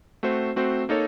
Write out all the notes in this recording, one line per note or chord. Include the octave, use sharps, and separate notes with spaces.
A3 C4 F#4 C5
A3 C4 F#4 C5
A#3 D#4 A4 C#5